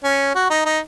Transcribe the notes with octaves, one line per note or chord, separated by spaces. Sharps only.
C#4
F#4
D#4
D#4